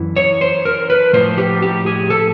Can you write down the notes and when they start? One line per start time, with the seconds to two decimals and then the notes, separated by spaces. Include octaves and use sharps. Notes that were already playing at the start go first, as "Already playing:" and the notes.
Already playing: F#2 E3
0.17 C#5
0.41 C5
0.65 A#4
0.90 B4
1.13 A2 F3 C5
1.38 G4
1.62 G4
1.86 G#4
2.10 A4